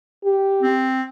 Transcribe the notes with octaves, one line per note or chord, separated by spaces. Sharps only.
G4
C4